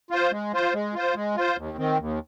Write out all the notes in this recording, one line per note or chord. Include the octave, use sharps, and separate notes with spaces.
F4 C5
G#3
F4 C5
G#3
F4 C5
G#3
F4 C5
D#2
D#3 C4
D#2